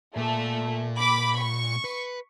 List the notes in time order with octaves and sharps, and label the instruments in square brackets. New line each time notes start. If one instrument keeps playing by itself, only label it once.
[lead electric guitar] A#2 [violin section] A3
[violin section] B5 D6
C#6
[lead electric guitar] B4